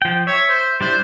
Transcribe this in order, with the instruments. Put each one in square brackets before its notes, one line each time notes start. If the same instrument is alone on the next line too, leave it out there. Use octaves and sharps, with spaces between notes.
[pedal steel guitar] F3 G5
[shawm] C#5 [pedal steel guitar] E5
[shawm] C5
[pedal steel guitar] G3 D4 E4 [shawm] C5